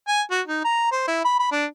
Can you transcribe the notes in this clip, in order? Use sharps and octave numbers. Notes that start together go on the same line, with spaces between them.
G#5
F#4
D#4
A#5
C5
E4
B5
B5
D4